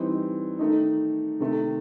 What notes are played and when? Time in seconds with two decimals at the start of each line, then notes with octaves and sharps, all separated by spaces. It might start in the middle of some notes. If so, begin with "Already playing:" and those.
Already playing: E3 G3 C4 D#4
0.59 D#3 A3 D#4
1.40 C3 D#3 A3